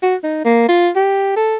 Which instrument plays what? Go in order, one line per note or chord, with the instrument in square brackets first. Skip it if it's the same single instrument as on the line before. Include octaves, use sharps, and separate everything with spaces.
[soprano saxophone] F#4
D#4
A#3
F4
G4
A4